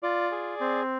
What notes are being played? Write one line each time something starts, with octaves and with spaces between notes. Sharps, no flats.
F4 D5
G#4
C4